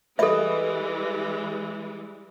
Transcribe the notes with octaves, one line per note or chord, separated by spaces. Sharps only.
E3 G3 G#3 A4 B4 D#5 E5